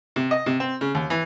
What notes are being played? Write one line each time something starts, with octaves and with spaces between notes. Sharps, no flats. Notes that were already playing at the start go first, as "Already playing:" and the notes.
C3
D#5
C3
C4
C#3
D#2
E3